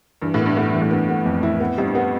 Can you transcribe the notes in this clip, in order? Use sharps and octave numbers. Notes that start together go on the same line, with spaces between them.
G2 E3
A2 B3
G2
A2 B3
G2 E3
A2
G2 B3
B3
F2
E4
B3
F2 G3
G2
B3